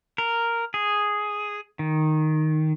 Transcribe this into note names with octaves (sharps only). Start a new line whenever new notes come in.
A#4
G#4
D#3